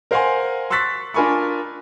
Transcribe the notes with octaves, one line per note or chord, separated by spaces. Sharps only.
A#4 C5 F5 F#5 G#5 C6
C6 C#6 E6 F#6 A6 B6
D4 F4 A#4 G#5 B5 C#6